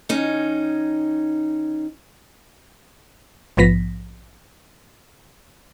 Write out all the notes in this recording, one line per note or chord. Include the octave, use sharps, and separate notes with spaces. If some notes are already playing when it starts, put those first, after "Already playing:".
D#3 C#4 D#4
A#1 G#2 F3 B3 A#6 B6